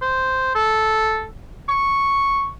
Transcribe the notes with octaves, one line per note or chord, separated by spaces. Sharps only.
C5
A4
C#6